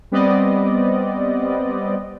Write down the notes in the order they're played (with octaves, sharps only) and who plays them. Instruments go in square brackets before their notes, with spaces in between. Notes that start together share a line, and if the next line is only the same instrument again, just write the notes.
[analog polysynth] G3 B3 C4 D5 D#5